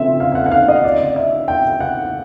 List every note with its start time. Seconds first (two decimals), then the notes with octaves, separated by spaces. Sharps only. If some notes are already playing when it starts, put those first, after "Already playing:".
Already playing: D2 C#3 F3 A3 C4 E5
0.20 F5
0.32 F5
0.35 F#5
0.46 F#5
0.51 F5
0.68 D#5
0.84 D5
1.16 E5
1.48 G5
1.80 F#5